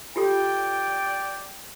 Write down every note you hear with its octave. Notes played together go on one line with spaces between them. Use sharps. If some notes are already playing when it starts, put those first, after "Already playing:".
F4 G4 A4 D5 G5